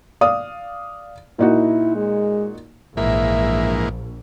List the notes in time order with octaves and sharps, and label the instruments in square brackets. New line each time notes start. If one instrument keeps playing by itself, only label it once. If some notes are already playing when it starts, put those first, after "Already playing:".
[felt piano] D5 F5 D#6
[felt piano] A#2 D#4 F#4 [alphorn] E4
[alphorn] G#3
[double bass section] A#1 [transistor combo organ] G#2 E3 A#3 [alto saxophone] E5